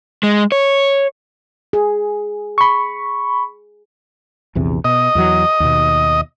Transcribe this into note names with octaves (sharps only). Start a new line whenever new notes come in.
G#3
C#5
G#4
B5 C#6
A#1 E2 C3
B2 D#5
E2 E3 F#3
D#2 B2